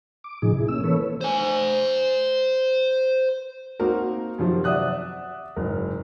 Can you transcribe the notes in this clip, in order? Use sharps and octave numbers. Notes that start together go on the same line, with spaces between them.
D6
A2 C3 F3 D#4 G#4
E4 G#4
A#3 C#4 E6
E3 A#3 A4 B4 C#5
C5 G#5
A#3 C4 D#4 F#4 A#4
F#2 C3 D#3 F3 F#3
D5 E5 F#5 D#6 F#6
F#1 G#2 A#4